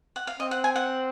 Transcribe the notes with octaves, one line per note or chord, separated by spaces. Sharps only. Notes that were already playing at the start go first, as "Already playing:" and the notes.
F#5
F5
C4 D#5
F#5
G#5
F#5